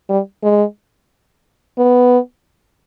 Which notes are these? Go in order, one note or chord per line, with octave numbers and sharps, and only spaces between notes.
G3
G#3
B3